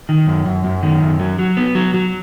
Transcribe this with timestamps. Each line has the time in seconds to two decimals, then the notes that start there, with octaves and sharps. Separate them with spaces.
0.09 D#3
0.27 F#2
0.46 F#2
0.64 F#2
0.83 D#3
1.01 F#2
1.20 F#3
1.39 F#3
1.57 B3
1.75 F#3
1.94 F#3